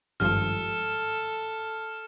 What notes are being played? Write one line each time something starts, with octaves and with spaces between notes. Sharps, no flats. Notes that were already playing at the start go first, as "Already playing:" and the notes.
G#1 G2 F3 A4 F6